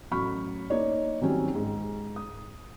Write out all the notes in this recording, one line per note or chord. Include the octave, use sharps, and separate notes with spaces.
A1 F#3 B5 C#6 F6
A#3 D#4 C#5 D5
D#3 F#3 G3 C4 C#4
G#2
D#6